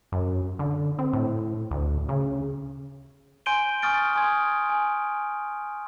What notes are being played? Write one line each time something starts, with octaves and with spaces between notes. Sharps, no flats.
F#2
D3
C4
A2
D2
C#3
G#5 C6 G6 D7 D#7 G7
G#5 C#6 D#6 F6 A6 D7
G#5 C6 D#6 G#6
G#5